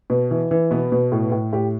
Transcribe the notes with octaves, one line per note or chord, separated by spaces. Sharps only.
B2
E3
E3
B2 B3
B2
A2
A2
A2 G4